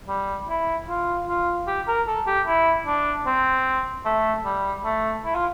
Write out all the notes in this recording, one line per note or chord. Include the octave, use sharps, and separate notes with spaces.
G3
E4
F4
F4
G4
A#4
A4
G4
E4
D4
C4
A3
G3
A3
E4
F4